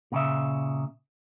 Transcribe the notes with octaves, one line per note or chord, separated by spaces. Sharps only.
A#2 C#3 E5